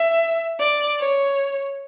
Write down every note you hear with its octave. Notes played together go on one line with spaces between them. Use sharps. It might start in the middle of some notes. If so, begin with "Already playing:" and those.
Already playing: E5
D5
C#5